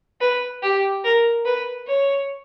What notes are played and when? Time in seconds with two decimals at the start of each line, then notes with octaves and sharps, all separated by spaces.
0.21 B4
0.63 G4
1.04 A#4
1.45 B4
1.87 C#5